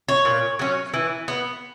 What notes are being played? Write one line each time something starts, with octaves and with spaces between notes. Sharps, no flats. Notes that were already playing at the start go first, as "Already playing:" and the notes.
C#5
A#2
F#3 C#4
E3
B3